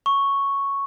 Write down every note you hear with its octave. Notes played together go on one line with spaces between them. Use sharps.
C#6